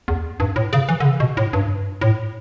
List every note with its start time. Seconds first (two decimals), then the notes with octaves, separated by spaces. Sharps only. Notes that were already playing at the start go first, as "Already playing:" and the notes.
0.08 E2
0.40 G2
0.56 A2
0.73 C#3
0.89 E3
1.00 D3
1.05 C#3
1.20 B2
1.37 A2
1.53 G2
2.01 A2